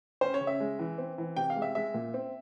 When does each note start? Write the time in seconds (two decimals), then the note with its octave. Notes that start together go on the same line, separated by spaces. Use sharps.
0.21 C#4 C5
0.34 C#5
0.41 C#3
0.47 E5
0.60 G#3
0.79 E3
0.98 C4
1.18 E3
1.36 C3 G5
1.50 F5
1.56 G#3
1.62 E5
1.75 G#3 E5
1.94 A#2
2.14 C4